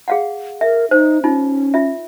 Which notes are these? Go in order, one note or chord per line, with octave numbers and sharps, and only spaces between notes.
G#4 F5 F#5
A#4 E5
D#4 C5
C#4 D#4 F4
F4 E5